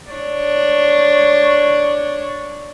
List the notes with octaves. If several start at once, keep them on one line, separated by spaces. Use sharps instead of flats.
D4 C#5